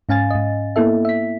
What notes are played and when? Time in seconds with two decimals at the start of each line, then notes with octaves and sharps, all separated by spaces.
0.09 G#2 C#4 F5 G#5 A6
0.30 G#2 D#5
0.76 A#3 B3 E4 A4 E5
1.05 E5 B6